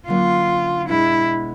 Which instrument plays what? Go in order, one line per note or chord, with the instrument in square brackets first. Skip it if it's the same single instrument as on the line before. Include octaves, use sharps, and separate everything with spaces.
[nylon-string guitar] D3 F#3 A#3 C#4 [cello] F4
[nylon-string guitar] B2 G#3 B3 D4 [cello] E4